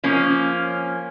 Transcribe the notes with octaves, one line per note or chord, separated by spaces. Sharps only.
F3 A#3 C#4